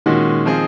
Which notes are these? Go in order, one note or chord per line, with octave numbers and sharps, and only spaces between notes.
A#2 D#3 G#3 C#4 F#4
F3 C4 D#4 G#4